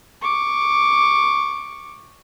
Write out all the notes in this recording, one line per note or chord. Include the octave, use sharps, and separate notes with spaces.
C#6 D6